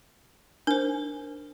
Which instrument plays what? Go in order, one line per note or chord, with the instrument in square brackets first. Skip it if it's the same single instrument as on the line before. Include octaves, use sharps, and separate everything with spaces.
[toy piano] D4 [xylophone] A#4 C5